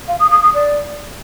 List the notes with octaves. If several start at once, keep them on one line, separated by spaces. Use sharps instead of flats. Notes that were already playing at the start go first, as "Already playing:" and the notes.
F5
D#6
D#6
D#6
D5